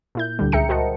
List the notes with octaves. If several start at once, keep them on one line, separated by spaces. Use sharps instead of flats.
A#2 E4 G6
D2 D3 G3
C#2 G#4 E5 G5 A#5 C#7
F#4 A#4 C5 D#5 F#5 A5